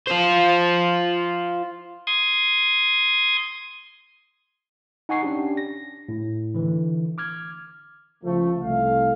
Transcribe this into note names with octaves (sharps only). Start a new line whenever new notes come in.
F4 C5
C6 D#6 G#6
D#4 F#5 G#5 C#6 C7
C#4 D4 G4
A#6
A2
D3 E3
D6 F6 G#6
C#2 F3 A3
C2 A3 F5